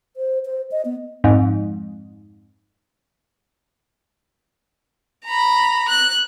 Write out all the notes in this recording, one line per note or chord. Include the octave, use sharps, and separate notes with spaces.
C5
C5
D#5
B3
F2 G#2
A#5 B5
F#6